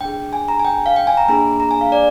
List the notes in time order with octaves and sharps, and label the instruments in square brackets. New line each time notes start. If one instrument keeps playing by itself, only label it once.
[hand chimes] D4 G#4 G5
G#5
A#5
G#5
G5
F5
G5
G#5
A#5
A#3 D4 G#4 A#5
A#5
G#5
F5
D5